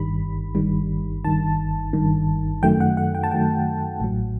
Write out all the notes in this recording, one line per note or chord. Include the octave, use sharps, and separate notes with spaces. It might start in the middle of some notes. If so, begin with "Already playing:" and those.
Already playing: G1 G2 D#3 G3 B5
G1 G2 D#3 G3
G1 G2 D#3 A5
G1 G2 D#3
F#2 D#3 F#3 A3 G5
F#5
F#5
G5
A5
F#2 D#3 F#3 A3 G5
A1 A2 F#3